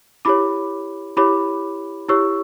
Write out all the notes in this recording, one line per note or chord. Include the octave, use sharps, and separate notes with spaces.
E4 G4 C#5 B5 D6
E4 G4 C#5 B5 D6
E4 G4 C#5 C#6 E6